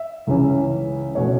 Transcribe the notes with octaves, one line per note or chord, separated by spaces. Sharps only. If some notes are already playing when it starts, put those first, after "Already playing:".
Already playing: E5
C#2 C#3 E3 C#4
B2 A3 C#4 C#5